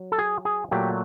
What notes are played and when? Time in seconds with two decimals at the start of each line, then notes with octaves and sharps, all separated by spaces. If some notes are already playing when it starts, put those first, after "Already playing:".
Already playing: F#3
0.12 A4
0.19 G#4
0.45 G#4
0.71 A#2 F#3 A3 G4